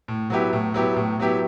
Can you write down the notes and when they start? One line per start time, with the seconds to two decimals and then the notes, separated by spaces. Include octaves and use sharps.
0.08 A2
0.30 F#3 B3 E4 G4
0.53 A2
0.74 F#3 B3 E4 G4
0.96 A2
1.20 F#3 B3 E4 G4